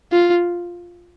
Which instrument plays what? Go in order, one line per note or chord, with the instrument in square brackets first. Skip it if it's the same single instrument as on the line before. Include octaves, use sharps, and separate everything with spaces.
[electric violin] F4